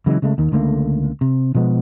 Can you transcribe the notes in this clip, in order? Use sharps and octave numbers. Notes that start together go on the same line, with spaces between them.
C#3 E3 F#3 G#3
C#3 G#3 A3
D#2 D#3
C#2 D3 A3 A#3
C3
B2 F3 G#3 B3